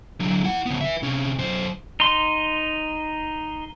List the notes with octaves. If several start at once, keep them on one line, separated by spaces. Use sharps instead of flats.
D3 F#3
E4 F#5
C#3 B3
B4 E5
C3 C#4
F#2 C5
D#4 C6